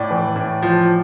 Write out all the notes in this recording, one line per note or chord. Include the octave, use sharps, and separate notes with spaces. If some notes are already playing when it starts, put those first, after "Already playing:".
Already playing: A2 D5
E3
A2
F3